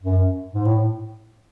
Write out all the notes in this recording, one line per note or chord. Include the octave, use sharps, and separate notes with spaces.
F#2
G#2
A2